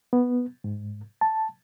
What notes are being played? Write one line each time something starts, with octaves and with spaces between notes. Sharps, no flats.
B3
G#2
A5